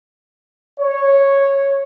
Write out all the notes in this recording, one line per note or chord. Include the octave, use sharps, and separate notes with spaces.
C#5